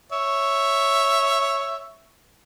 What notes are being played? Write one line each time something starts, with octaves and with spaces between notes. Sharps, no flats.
C#5 E5